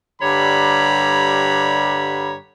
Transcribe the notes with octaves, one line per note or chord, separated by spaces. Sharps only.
G2 D3 G3 C#5 A#5 B5